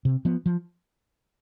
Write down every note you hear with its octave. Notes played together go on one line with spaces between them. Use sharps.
C3
F3 B3
F3